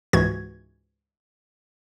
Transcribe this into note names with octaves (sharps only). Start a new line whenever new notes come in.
C#2 G#2 E3 F#4 G#6